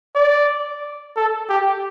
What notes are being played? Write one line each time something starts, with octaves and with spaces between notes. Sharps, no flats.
D5
A4
G4